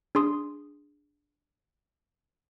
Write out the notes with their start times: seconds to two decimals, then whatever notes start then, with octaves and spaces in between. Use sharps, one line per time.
0.15 D4 G#4 C6 D#6